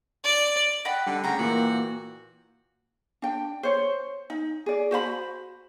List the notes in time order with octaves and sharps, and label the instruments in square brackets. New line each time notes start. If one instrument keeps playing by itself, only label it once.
[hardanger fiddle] D5
[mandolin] D#5 F#5 B5 [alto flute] G5
[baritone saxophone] D3 [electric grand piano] G3
[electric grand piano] D2 [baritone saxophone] C#3 [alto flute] F#5 [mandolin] G5 A#5 B5
[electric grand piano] A#2 E3 [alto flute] A#3 [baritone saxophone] F#4
[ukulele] D4 G5
C5 C#5
D#4
G#4 D5
F#4 C5 F5 B5